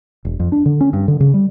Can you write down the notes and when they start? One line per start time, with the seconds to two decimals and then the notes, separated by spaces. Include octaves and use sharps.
0.25 E1
0.40 F2
0.52 D4
0.66 D3
0.81 C#4
0.93 G2
1.08 D3
1.20 C#3
1.34 G3